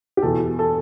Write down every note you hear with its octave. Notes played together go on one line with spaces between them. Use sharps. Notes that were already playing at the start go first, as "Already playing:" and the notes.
G4
E2 B2 A4
A4